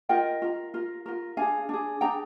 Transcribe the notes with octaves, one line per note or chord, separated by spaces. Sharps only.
F4 A#4 D#5 G5
F4 A#4
F4 A#4
F4 A#4
D4 G#4 F5 G#5
D4 G#4
D4 G#4 G5 A#5